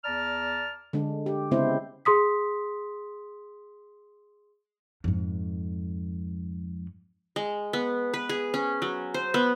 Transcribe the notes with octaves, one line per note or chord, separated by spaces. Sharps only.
E2 D5 A5 A#5 F6
D3 G#3 D4
G4
C#3 G#3 B3 C4 E4 C5
G#4 C6 D#6 B6
F2 G#2
G#3
B3
B4
G#4
C#4
F#3
C5
B3